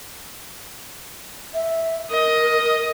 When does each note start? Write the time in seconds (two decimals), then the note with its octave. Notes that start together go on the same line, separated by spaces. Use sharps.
1.55 E5
2.11 A#4 D#5